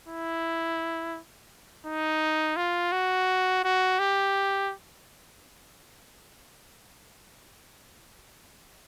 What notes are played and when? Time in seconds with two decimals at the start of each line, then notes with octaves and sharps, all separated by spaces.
0.08 E4
1.86 D#4
2.57 F4
2.92 F#4
3.64 F#4
3.99 G4